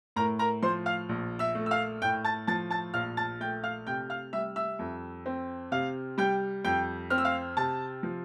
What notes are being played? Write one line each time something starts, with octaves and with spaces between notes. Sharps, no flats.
A2 A#4 A#5
A#4 A#5
F3 C5 C6
F5 F6
A#1
E5 E6
A3
E6
F5 F6
A2 G5 G6
A5 A6
F3 A5 A6
A5 A6
A#1 F5 F6
A5 A6
A3 G5 G6
F5 F6
C3 G5 G6
F5 F6
G3 E5 E6
E5 E6
F2
C4
C3 F5 F6
G3 G5 G6
F2 G5 G6
C4 F6
E6
F5 F6
C3 A5 A6
F3